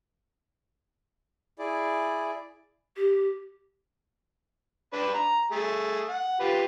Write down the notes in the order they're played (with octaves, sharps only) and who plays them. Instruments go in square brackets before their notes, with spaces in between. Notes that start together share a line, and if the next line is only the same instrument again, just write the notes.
[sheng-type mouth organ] E4 G#4 D5
[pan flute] G4
[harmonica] D4 B4
A#5
A3 G#4
F#5
F4 G4 B4